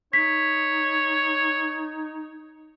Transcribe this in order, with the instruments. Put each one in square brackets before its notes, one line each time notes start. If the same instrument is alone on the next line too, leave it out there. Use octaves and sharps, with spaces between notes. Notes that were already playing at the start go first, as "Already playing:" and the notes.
[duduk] D#4 [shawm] C#5 [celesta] B6